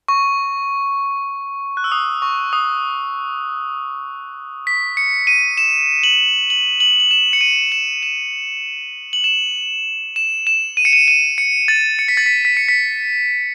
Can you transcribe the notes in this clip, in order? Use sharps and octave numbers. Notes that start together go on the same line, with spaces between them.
C#6
F#6
E6
D#6
C#6
D#6
B6
C#7
D#7
E7
F#7
F#7
F#7
F#7
E7
C#7
D#7
E7
E7
F#7
E7
E7
E7
D#7
C#7
D#7
D#7
C#7
A6
C#7
B6
A6
B6
B6
C#7
B6